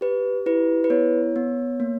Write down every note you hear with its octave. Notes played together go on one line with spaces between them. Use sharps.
G4 B4
E4 B4
B4
B3 C#5
B3
A#3